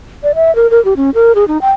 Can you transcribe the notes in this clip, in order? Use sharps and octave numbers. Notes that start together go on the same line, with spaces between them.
D5
E5
A#4
A#4
G4
C#4
A#4
G#4
D#4
G5